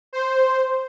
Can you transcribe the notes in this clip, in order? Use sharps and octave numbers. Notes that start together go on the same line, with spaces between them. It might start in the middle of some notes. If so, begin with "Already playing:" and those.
C5